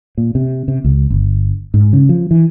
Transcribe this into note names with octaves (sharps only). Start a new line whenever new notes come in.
A#2
C3
C3
C#2
G1
G#2
C#3
F3
E3